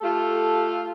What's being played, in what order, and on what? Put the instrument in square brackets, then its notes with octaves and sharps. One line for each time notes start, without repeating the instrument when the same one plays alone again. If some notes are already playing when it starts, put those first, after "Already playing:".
[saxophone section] A3 F4 G4 A4